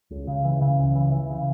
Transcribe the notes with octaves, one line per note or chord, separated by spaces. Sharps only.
C#2
C#3
E3
C#3
C#2
E3
E3
C#3